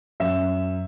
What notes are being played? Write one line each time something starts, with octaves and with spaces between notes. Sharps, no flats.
F#2 E5